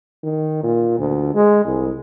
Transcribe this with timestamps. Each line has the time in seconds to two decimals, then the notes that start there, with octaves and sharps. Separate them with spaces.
0.23 D#3
0.63 A#2
0.99 D2
1.35 G#3
1.65 C2